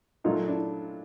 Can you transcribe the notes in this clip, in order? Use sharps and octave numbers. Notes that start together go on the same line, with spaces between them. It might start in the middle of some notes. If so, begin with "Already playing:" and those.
A#2 F#3 A3 D#4 F4
D4 E4